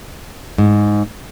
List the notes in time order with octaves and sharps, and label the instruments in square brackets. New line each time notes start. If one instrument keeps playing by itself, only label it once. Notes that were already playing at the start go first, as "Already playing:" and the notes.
[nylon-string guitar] G#2